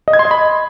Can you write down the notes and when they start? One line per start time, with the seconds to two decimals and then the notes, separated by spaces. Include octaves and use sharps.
0.08 D#5
0.13 G#6
0.19 C6
0.25 D#5
0.31 B5